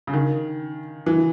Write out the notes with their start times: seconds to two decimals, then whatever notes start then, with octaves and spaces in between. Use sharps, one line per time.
0.07 C#3
0.13 D#3
1.06 E3